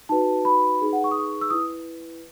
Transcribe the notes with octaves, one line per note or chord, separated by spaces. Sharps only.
D#4 F#4 B4 A5
B5
D#4 G#4 B4
F#5
C#6
D#6
C#6
E6
E4 B4 D#6